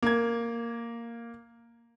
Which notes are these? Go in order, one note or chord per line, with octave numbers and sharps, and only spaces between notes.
A#3 G#6